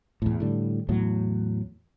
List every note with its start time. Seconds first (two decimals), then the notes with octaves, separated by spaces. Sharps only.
0.22 E2 A2
0.40 A2 D3 G3
0.89 E2 A2 F#3